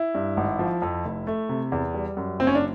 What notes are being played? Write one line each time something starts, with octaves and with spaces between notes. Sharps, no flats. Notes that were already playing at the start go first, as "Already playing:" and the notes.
Already playing: E4
G2
G#1
F3
F2
F1
A3
C3
E2
G3
F#2
F#1 C4
C#4
D4